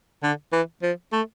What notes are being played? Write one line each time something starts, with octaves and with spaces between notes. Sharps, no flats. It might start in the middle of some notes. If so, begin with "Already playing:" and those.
D3
E3
F3
A3